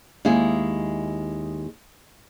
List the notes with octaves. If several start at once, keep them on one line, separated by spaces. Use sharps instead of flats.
D#2 G#3 E4 G#4